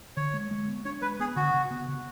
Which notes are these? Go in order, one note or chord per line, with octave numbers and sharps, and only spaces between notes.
D3 C#5
G#3
G#3
B3
D4 C#5
G#3 B4
B3 G#4
D3 F#4
C#3
B3
C#3